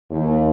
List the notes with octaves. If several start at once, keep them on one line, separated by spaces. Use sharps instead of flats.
D#2